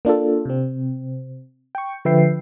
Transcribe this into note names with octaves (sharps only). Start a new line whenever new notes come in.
A#3 D4 F4 A4
C3 C4
G5 C#6
D3 F3 B4 E5 G5 C7